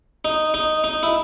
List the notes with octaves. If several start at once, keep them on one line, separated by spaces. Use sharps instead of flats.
D#4
D#4
D#4
E4